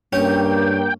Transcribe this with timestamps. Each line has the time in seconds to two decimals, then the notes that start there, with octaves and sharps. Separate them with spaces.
0.13 G2 A#3 C#4 G5